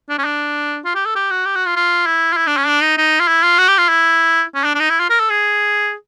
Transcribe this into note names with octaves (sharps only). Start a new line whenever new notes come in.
D4
C#4
D4
F4
G4
A4
G4
F#4
G4
F#4
F4
F4
E4
F4
E4
D4
C#4
D4
D#4
D#4
F4
E4
F4
F#4
G4
F4
E4
C#4
D4
D4
D#4
E4
F4
A#4
A4
G#4